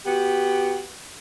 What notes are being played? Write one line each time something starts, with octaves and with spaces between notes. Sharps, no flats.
B3 F#4 G4